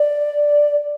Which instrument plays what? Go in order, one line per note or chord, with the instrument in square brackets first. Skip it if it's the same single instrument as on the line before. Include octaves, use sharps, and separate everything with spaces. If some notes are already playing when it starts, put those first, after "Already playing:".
Already playing: [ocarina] D5